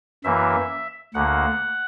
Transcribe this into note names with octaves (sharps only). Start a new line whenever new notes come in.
F#2 E3 A#3 E5
D2 D3 A#3 F#5